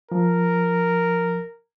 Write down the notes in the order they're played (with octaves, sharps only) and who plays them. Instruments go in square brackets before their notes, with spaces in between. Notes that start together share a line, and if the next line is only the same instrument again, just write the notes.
[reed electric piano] F3 [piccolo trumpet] A#4